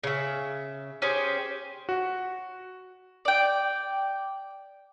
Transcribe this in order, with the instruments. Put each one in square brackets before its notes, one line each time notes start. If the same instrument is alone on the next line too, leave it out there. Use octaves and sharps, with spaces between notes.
[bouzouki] C#3 E5
C#4 G4 G#4 C5
[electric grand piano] F#4
[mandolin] D5 G5